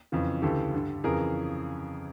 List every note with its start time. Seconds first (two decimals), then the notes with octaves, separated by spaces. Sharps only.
0.12 F2 C#3 E3
0.42 D2 C#3 E3 G4 A4
0.73 G2 D3
1.04 F2 C#3 E3 G#4 A#4